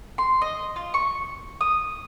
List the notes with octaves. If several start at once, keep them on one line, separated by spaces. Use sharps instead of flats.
C6
D#5
F4
C#6
D#6